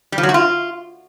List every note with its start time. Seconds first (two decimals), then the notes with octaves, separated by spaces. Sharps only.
0.12 G3
0.18 F3
0.23 F#3
0.29 F#4
0.34 F4